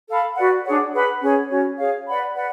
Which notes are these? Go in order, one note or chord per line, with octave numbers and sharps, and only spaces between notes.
A4 F5 B5
F#4 B4 D5 F#5
D4 G#4 C#5 F#5
G#4 B4 F#5 B5
C#4 G#4 C#5
C#4 F#4 C#5
G#4 C#5 F5
B4 D5 F#5 B5
B4 D5 F#5